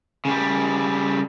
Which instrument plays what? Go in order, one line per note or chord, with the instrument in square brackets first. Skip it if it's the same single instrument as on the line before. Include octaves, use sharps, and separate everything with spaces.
[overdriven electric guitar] C#3 G3